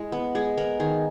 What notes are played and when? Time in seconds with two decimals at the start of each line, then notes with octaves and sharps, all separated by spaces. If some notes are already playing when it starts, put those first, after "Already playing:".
Already playing: G#3 E4 G#4
0.12 B3
0.35 G#3 G#4
0.57 B3 A#4
0.80 D#3 G#4